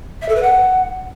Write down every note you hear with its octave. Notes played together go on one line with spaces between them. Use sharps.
E5
A4
B4
F#5